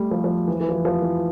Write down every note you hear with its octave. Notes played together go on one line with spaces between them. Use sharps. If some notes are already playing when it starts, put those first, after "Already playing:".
Already playing: G3 A3
F3
F3
E3
E3
F3
E3
F3
E3